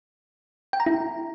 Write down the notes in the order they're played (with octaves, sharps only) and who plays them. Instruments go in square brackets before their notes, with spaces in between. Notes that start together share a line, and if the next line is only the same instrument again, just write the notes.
[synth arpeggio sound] G5
A#5
E4